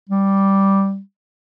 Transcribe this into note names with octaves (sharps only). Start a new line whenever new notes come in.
G3